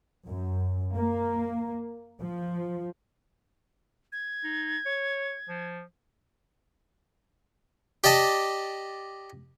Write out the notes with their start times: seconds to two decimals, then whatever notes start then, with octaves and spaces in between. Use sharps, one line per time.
0.29 F#2
0.95 A#3
2.20 F3
4.12 G#6
4.44 D#4
4.86 C#5
5.49 F3
8.04 G4 D5 D#5 A5